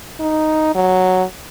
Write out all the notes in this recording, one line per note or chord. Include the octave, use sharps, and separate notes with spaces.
D#4
F#3